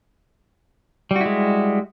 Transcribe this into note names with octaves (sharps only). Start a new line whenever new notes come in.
G3 G#3 E4 F#4